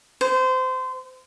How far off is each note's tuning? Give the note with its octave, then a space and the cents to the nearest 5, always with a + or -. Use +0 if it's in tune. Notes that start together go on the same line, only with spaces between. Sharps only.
C5 -25